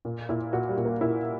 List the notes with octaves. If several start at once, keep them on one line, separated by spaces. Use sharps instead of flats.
A#2
A#2 E4
A#2 F#4
G3
A#2
A#3
A#2 E4